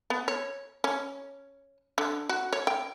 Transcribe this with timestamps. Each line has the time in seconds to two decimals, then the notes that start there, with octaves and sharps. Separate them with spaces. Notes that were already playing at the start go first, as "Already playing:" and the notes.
0.10 B3
0.28 C#5
0.84 C#4
1.98 D3
2.29 F#4
2.53 C#5
2.67 G5